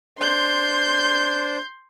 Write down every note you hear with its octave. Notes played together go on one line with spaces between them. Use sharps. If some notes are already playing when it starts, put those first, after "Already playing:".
D4 C5 C6 G6